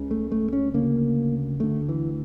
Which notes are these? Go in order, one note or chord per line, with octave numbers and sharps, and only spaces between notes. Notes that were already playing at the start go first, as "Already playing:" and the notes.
Already playing: C#2 C#3
A3
A3
C#4
D2 C#3 A#3
D2 D3 A3
E3